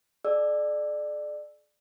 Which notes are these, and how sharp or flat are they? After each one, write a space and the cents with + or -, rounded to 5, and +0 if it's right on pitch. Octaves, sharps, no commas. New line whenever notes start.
G#4 +45 D5 +25 E6 +0